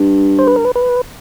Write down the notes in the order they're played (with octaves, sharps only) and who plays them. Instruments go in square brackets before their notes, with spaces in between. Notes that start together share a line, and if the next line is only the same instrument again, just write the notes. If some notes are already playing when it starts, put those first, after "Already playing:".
Already playing: [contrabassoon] G2
[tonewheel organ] C5
B4
A#4
B4
B4